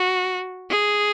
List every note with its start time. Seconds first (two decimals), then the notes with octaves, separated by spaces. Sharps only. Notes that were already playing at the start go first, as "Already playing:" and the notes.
Already playing: F#4
0.70 G#4